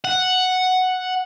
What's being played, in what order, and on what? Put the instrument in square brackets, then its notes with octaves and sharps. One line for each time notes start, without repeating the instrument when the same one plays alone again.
[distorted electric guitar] F#5